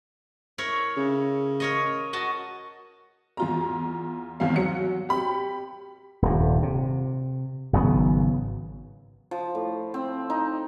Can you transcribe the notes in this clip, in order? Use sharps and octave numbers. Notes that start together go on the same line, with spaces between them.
E4 A#4 C#5
C#3
A#4 C#5 D#5
F#4 D#5 A5
E2 F4 A#5
G#1 E2 F5
F#3 F#4 C#7
G4 B5
D#1 G2
C3
G#1 C#3 F#3 B3
F3
A2
C4
D#4